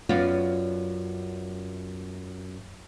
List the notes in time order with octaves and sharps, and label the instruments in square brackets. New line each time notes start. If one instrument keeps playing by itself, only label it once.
[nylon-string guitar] F#2 B3 F4 D5